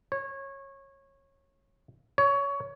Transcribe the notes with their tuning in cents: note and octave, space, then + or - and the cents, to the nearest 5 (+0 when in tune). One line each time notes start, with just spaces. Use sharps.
C#5 -20
C#5 +20